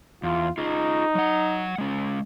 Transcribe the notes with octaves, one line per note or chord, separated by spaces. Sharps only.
E2 F4
D#4 F4 G#4
F#3 F#5
G#3 C#4